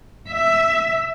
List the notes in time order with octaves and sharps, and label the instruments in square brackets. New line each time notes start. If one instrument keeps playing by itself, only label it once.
[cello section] E5